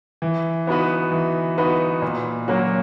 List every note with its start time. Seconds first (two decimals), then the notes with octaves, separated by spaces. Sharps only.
0.22 E3
0.67 B3 D#4 F#4 B4
1.12 E3
1.58 B3 D#4 F#4 B4
2.02 A#2
2.48 F#3 A#3 C#4 F#4